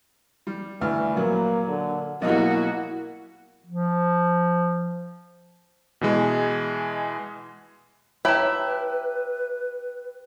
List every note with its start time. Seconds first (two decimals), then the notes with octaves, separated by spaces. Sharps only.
0.47 G3
0.81 D2 E3 F6
1.16 A#2 F#3 A#3
1.68 D3
2.22 B2 F#3 A#3 E4 F#4 D#5
3.67 F3
6.01 B2 E3 G#3
8.25 E4 G4 B4 C#5 A5 A#5